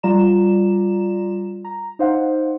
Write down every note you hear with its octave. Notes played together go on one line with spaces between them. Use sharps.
G3 F4 D5 A#5 E7
A#5
D#4 C5 F5 F#5